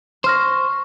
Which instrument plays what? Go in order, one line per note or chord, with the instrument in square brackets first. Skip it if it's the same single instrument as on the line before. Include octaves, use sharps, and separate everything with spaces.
[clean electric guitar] C5 [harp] C#6 F6 A#6